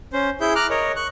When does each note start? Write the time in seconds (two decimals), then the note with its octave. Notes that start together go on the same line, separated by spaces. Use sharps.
0.13 C#4 C5
0.41 E4 G#4 E5 G6
0.56 A#5 D6 F6 F#6
0.70 A#4 C#5 D#5
0.96 C#6 F#6